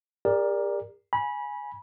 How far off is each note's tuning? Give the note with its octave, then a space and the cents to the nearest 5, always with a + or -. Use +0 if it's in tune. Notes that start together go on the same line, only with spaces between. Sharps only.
G4 +45 A#4 +10 D5 +0
G#5 +0 B5 -25